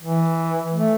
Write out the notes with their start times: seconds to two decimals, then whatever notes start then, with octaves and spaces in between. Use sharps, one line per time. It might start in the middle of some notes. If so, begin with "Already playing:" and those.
0.01 E3
0.74 A3